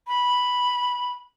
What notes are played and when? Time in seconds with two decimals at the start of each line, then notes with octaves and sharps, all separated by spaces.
0.07 B5